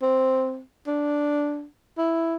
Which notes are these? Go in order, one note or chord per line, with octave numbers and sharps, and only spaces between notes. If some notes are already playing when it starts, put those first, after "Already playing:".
C4
D4
E4